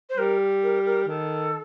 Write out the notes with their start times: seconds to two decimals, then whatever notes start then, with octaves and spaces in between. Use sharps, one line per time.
0.10 C5
0.17 G3 A#4
0.63 A#4
0.86 A#4
1.08 D#3 A4